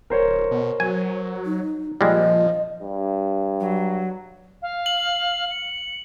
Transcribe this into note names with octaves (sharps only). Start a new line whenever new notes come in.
D1 A#4 C5 C#5
B2
F#3 G#5
D#4
A#2 F3 G3 G#3 D#5
G2
F#3
F5
F#7
C#7